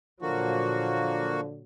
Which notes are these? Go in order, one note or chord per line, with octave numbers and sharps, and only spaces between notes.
A#2 D3 F3 F#3 A#3 F#4